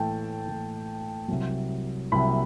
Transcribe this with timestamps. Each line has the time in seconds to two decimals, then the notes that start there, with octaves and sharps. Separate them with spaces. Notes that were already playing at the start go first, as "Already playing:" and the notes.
Already playing: A2 E3 A3 G5 A5
0.47 A2 E3 A3
1.28 C2 C3 F#3
2.12 C2 C3 F#3 B5